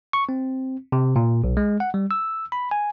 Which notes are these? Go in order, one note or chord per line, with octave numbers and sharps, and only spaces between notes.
C#6
C4
C3
A#2
B1
G#3
F#5
G3
E6
B5
G#5